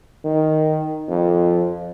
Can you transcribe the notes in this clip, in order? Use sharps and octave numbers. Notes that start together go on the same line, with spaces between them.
D#3
F2